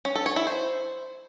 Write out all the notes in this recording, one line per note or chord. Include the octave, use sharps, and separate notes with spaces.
C#4
A4
C#5
E4
C5